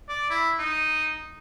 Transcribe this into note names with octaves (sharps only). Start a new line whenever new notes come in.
D5
E4
D#4